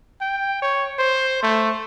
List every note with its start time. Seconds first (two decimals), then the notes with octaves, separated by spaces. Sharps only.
0.21 G5
0.62 C#5
0.99 C5
1.42 A3